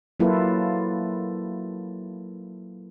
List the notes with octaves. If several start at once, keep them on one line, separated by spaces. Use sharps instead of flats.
F#3 A#3 E4 F4 A4 B4